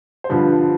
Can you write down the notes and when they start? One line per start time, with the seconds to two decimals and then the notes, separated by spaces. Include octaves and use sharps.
0.24 C5
0.30 G2 D3 F3 B4